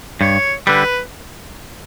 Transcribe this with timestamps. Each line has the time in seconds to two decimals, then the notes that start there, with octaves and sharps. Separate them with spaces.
0.21 G2 C#5
0.67 D3 G3 B4